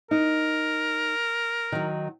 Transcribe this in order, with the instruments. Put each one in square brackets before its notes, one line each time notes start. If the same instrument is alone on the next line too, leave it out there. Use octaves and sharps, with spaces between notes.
[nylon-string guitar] D#4 [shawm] A#4
[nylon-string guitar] D#3 F#3